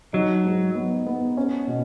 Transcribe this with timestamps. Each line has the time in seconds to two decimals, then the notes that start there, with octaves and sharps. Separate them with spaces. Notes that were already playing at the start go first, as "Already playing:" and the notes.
0.13 F#3 D#4
0.44 G#2
0.75 B3
1.06 B3
1.37 C#4
1.67 B2